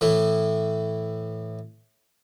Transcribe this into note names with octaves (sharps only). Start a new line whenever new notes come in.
A2 E3 A3